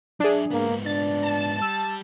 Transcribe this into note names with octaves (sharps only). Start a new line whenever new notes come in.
F#3 D4 G#4 E5
G#2 A#3 B3
D4 A6
A5
G3 E6